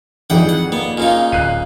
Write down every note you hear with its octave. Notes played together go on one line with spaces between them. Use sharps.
G#1 F2 E3 G#4 F#5 G5
F#5
A#3 B3
A#2 C#3 D#4
D1 F#6 C7 D#7